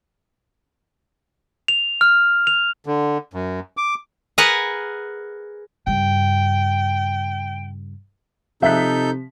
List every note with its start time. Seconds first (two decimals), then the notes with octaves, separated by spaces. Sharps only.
1.68 F7
2.01 F6
2.47 F7
2.86 D3
3.34 F#2
3.77 D6
4.38 G#4 A#4 B4 F#5 G#5
5.87 G2 C#3 G5
8.62 C3 F3 D#4 A4 E5 F#6 G6 B6